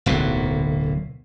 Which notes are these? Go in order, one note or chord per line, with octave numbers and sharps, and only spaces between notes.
D1 B1 A#2 D3